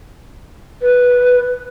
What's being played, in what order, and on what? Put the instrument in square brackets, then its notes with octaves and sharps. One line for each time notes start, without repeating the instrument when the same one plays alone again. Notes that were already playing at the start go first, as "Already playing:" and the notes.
[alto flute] B4